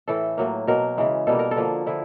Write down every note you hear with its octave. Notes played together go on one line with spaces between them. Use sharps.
A2 E3 A3 A4
A2 F#3 A#3
B2 F#3 A#3 A#4
C#3 E3 G#3
B2 G3 A#3 A4
A#4
A4
D3 F3 A#3
D3 F3 E4